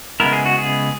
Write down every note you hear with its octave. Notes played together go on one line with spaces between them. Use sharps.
C#3 G#3 B3 E4 A#4
G#4
F#4
G#4